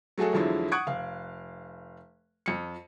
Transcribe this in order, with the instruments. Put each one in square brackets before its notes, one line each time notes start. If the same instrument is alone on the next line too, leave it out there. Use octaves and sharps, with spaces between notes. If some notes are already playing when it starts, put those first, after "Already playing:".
[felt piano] F#3 A3 F#4 G#4 A4
E2 D3 F3 F#3 G#3 E4
F#5 C#6 D#6 F#6 G#6 D7
F1 F5
F2 C#7